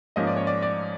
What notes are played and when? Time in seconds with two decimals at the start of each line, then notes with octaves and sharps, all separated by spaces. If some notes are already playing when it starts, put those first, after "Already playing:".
0.16 G#2 F3 A#3 C#4 D#5
0.27 D5
0.36 C#5
0.47 D5
0.62 D5